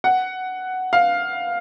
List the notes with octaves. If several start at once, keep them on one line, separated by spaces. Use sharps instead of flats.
F#5
F5